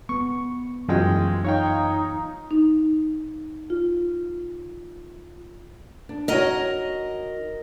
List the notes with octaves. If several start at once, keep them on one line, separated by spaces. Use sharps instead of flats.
B3 C#6
C2 F#2 E3 G#3 F4 D#5 G5
D#4 C#5 F5 G5
D#4
F4
D4
D#4 F#4 A#4 C#5 D#5